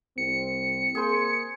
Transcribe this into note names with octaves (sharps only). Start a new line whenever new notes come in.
C2 C4 C#7
A#3 G#4 C5